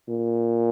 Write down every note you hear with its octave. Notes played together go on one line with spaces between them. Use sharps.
A#2